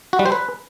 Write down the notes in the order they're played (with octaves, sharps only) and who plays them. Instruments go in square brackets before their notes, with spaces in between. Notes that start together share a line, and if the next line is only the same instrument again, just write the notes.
[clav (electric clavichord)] F#4
G3
C5
B4